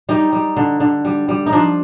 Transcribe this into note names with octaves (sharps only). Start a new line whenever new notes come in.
G3 D#4
G3
D3
D3
G3
G3
D#4
F3 D4